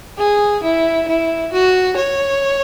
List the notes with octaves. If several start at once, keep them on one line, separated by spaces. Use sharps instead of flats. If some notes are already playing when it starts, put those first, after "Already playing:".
G#4
E4
E4
F#4
C#5